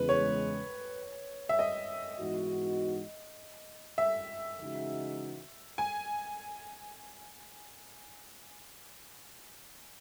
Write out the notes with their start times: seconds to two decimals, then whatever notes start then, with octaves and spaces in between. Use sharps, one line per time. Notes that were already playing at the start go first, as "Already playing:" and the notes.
Already playing: E2 C#3 G#3 B4
0.09 C#5
1.49 E5
1.59 D#5
2.19 G#2 E3 B3 D#4 F#4
3.98 E5
4.58 C#3 E3 G#3 D#4 F#4
5.78 G#5